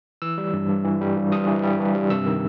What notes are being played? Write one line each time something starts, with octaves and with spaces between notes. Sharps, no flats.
E3 E6
G3
G2
G2
E3
G3
G2
G2 D#6
E3
G3
G2
G2
C3 E6
D#3